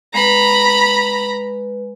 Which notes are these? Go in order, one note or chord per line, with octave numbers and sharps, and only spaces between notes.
G#3 B4 A#5 B5